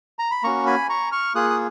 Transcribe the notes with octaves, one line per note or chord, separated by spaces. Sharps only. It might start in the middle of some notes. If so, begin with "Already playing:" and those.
A#5
B5
A#3 C#4 F#4 A#5 C#6
G#5 B5
A#5 C#6
C#6 F6
A#3 F4 G#4 D#6 F#6
D#6